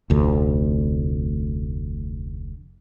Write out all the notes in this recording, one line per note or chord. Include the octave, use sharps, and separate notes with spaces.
F1 D2